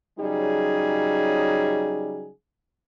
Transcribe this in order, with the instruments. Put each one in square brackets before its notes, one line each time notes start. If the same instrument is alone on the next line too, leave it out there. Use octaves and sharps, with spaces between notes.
[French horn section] C#3 F#3 G3 D#4 G#4